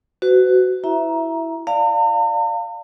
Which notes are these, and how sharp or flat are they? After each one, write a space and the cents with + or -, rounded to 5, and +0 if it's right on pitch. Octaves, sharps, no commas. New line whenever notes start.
F#4 +15 B4 +40
E4 +0 E5 +0 A#5 +15
D5 +0 F5 +0 A#5 -45